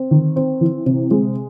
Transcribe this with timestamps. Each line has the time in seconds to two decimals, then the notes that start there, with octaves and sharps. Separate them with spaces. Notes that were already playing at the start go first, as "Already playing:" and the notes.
Already playing: C4
0.11 D#3
0.36 C4
0.61 E3
0.86 C3
1.11 G#3